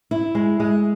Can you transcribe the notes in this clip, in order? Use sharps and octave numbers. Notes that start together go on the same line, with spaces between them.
E4
G#3
G#3